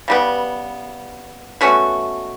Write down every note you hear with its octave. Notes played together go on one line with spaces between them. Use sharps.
C#3 G3 B3
B2 A3 C#4 F#4